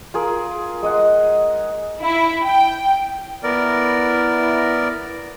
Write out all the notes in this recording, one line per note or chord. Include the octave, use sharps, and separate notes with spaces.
F4 G#4 A#4
G#3 D#5 F#5
E4
G5
B3 E4 A#4 D5